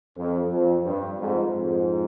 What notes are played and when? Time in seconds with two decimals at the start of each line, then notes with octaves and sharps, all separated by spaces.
0.17 F2
0.52 F2
0.86 G2
1.20 F2 G#2
1.54 F2 G#2